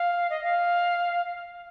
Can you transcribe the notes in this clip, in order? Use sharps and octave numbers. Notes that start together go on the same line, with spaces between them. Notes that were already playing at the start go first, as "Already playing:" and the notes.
Already playing: F5
D#5
F5